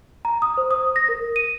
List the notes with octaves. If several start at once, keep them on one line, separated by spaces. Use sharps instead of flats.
A#5
D#6
C5
D#6
A#6
A#4
D#7